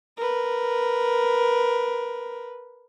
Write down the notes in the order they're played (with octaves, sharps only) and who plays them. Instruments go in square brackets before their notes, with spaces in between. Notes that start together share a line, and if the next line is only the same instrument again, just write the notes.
[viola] A#4 B4